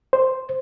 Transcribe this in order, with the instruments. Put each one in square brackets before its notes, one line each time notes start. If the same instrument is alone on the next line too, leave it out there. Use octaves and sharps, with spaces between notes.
[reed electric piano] C5